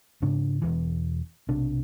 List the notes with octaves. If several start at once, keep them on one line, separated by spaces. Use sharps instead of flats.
G#2 C#3 D4
E1 E2 E3
B1 C3 D4